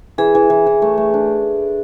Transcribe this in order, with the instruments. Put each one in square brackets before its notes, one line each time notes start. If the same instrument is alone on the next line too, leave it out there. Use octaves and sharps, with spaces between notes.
[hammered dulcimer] E3 [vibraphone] G#4
[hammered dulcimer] E3
E3
E3
A3
A3
D4